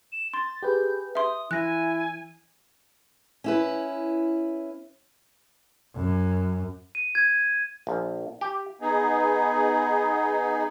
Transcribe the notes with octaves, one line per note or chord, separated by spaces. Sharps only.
E7
C6 A6
G4 G#4 B4 G6
E5 C6 D#6
E3 E4 G#5 F#6 A#6
C#4 E4 B4
F#2
D#7
G#6
A#1
G4
B3 D#4 G#4